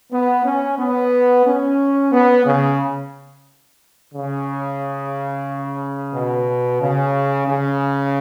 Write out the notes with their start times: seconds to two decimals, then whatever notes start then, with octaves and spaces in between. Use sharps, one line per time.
0.12 B3
0.45 C#4
0.78 B3
1.46 C#4
2.12 B3
2.46 C#3
4.13 C#3
6.14 B2
6.81 C#3
7.48 C#3